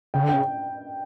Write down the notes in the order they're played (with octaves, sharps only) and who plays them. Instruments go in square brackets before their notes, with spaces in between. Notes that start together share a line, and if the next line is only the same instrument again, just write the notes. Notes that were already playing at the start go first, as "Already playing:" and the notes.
[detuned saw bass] C#3 [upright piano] G5
[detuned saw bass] D3
[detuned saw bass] C#3 [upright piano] G5